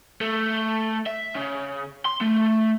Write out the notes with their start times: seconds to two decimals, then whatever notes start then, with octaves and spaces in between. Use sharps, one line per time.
0.21 A3
1.07 E5
1.36 C#3
2.05 C6
2.21 A3